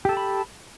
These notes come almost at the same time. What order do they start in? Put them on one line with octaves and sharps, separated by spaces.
G4 A4 A5 B5